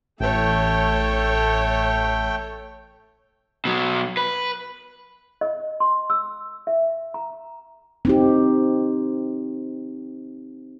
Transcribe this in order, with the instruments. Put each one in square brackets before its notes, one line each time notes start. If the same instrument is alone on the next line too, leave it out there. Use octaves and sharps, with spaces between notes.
[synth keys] A1 [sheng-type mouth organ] A3 G5 [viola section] A4 C#5
[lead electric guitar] B2 F#3
B4
[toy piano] D#5
C6
E6
E5
A#5
[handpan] C4 D#4 G4